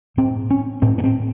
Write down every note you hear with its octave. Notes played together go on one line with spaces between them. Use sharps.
A2 C4
C#4
A2 C4
B3
C4